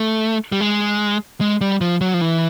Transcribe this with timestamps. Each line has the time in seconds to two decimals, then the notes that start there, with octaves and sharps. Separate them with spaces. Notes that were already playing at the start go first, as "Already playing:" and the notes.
Already playing: A3
0.52 G3
0.61 G#3
1.41 G#3
1.61 G3
1.81 F3
2.01 F#3
2.14 F3
2.21 E3